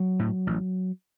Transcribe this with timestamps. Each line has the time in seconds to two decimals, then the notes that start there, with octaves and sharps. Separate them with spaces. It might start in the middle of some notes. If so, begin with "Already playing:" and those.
Already playing: F#3
0.19 A2
0.47 A1